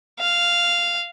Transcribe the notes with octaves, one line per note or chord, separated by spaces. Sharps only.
F5